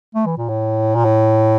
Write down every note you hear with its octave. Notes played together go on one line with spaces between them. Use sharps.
A3
E3
A#2
A2
A#2
A2